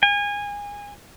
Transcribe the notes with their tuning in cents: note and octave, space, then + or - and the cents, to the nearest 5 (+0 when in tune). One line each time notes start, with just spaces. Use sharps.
G#5 -25